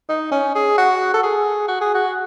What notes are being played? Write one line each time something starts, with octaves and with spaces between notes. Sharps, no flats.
D#4
C#4
G#4
F#4
A4
G#4
F#4
G#4
F#4